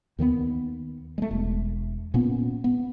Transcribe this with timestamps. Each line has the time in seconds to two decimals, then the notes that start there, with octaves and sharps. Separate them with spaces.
0.18 D#2 D#3 F#3 B3
1.18 G#3 A3
1.31 E1
2.14 A#2 A#3 B3 C#4
2.64 B3